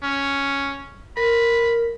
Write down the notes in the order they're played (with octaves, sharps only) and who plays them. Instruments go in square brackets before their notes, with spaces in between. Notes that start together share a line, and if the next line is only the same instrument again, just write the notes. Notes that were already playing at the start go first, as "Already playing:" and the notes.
[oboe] C#4
[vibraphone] A#4 [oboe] B5